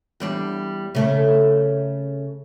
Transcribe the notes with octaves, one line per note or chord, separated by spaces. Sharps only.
E2 G3 D4
C#3 A3